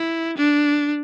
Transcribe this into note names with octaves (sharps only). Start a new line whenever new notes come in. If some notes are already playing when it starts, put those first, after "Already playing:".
Already playing: E4
D4